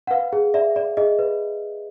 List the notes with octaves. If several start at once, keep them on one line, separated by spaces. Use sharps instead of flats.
F#5
B4 F5
G#4
D5 E5
D5
G#4 D#5
B4